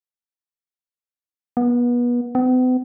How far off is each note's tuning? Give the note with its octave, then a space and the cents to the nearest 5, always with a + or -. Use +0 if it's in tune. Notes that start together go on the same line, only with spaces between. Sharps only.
B3 -30
B3 +45